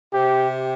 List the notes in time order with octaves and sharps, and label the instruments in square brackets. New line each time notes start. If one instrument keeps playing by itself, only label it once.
[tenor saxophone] C3 [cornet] G4